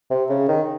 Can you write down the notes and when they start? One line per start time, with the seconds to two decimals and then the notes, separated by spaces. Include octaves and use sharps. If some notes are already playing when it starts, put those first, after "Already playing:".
0.10 C3
0.30 C#3
0.48 D#3